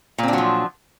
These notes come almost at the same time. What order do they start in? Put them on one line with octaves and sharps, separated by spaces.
A#2 C4 D4 F#3 F3